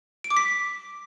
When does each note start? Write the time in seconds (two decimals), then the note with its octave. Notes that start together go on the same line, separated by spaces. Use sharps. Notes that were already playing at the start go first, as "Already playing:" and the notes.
0.24 D7
0.30 D6
0.37 B6